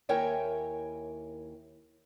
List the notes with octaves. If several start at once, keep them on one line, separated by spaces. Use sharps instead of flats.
D#2 E4 A#4 C#5 G5 G#5